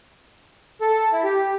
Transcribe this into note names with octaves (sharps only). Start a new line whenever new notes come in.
A4
E4
G4